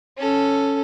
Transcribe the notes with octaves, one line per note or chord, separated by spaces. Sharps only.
C#4 A4